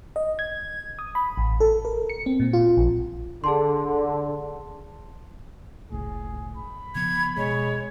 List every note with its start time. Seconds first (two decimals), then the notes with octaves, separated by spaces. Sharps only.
0.16 D#5
0.39 G#6
0.99 D#6
1.15 B5
1.37 A1
1.60 A4
1.85 A#4
2.09 C#7
2.26 C4
2.40 A#2
2.53 F4
2.77 A#1
3.44 D3 G#4 A5 C6
5.92 F#1 C#2 A2 G#4
6.57 B5
6.95 C#3 F3 B3 G#6
7.37 B2 G#3 C#5